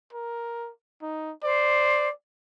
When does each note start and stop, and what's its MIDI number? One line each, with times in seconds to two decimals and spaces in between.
0.13 0.71 70
1.02 1.33 63
1.44 2.08 72
1.44 2.12 74